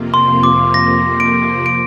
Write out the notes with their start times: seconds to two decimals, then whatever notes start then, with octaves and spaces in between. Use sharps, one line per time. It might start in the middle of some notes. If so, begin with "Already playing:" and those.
Already playing: F2 C3 F3 A#3
0.14 C6
0.43 D6
0.74 A#6
1.20 D7
1.66 D7